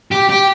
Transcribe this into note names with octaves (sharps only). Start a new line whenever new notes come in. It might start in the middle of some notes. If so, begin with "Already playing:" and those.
G4
G4